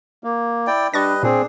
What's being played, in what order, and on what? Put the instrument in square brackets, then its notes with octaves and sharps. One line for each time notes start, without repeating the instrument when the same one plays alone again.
[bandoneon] A#3
[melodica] E4 D5 G5
[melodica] G3 B4 D#5 [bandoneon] D4 [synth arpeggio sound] C#6 A6 A#6
[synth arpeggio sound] A#2 [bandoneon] C4 G#4 [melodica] D4